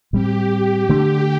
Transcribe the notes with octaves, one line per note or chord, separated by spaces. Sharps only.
A2 G3 C4 G4
D3 A3 D4 G4